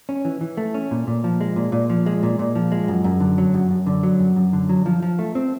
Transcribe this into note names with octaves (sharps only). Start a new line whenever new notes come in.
C#4
E3
E3
A3
C#4
A#2
A#2
F3
G#3
A#2
A#2
F3
G#3
A#2
A#2
F3
G#3
F#2
F#2
D3
F#3
F#2
F#2
D3
F#3
F#2
F#2
D3
F#3
F3
F3
A3
C4